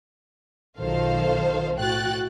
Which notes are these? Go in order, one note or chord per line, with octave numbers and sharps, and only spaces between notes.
B1 D#3 F4 A4 C5 F5
A2 F#4 G5 F#6 A6